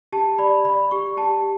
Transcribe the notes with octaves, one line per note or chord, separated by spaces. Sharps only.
G4 A5
D5 B5
D5 B5
G4 C#6
G4 A5